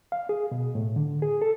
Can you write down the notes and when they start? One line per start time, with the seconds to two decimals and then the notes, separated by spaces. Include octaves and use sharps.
0.12 F5
0.29 G#4
0.52 B2
0.75 A2
0.96 D3
1.22 G#4
1.42 A4